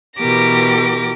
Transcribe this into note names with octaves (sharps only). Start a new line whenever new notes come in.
B2 E3 G4 A#4 D6 A#6